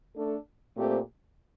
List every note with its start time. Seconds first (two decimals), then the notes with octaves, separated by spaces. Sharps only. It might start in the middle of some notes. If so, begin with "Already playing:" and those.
0.13 A3 D4 A4
0.76 A#2 A3 C4 G4 C5